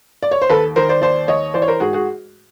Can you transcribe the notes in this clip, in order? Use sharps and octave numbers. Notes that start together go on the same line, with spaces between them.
D5
C#5
C5
D#2 A4 B4
D#3 A#4 C5
C5 D5
D#2 C5 D5
D#2 C#5 D#5
E3 C5 D5
C#5
A#4 C5
G#2 F#4 G#4
F#4 G#4